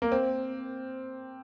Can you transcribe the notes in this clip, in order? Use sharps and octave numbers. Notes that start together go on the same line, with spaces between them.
A#3
C4